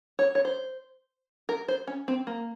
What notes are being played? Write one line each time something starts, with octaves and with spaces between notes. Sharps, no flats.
C#5
C#5
C5
A#4
C5
C#4
C4
A#3